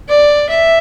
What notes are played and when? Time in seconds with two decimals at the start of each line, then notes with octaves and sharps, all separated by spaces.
0.08 D5
0.49 E5